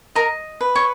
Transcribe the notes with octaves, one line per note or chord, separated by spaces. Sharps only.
A#4 D#5 A#5
B4
C#5 C#6